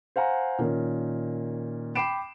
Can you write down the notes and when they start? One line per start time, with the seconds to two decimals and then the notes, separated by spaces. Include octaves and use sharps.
0.16 C5 F5 F#5 G#5 A#5
0.58 A#2 D#3 C#4
1.95 G5 B5 D6 C7 D7 E7